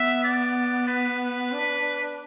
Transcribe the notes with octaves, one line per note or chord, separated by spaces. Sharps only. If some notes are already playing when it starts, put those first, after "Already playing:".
Already playing: B3 E5
D5
B4
D4